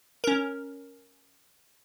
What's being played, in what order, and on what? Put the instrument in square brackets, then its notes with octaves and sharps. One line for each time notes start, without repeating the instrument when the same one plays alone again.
[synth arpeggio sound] C#4 A#4